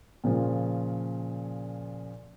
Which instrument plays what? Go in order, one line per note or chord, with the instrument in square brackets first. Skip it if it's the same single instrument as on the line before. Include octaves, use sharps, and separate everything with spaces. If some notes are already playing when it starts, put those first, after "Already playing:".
[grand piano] A#2 C#3 F3